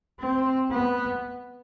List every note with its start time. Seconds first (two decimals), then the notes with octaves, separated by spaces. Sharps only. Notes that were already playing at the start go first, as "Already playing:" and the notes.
0.19 C4
0.70 B3